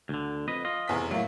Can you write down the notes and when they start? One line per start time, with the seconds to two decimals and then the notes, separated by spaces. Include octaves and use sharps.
0.09 D2 D3
0.48 F2 B4 D#5
0.65 F4 D#5
0.88 F1 E2 B6
1.11 A2 F#3 A#3